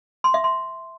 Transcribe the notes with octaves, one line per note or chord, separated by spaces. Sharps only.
C6
E5
C6